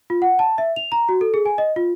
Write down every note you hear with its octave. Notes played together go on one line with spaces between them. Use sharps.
F4
F#5
A5
E5
F7
A#5
F#4
A4
G#4
G#5
D#5
F4